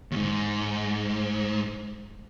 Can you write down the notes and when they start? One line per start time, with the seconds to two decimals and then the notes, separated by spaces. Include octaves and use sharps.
0.11 D#2 G#2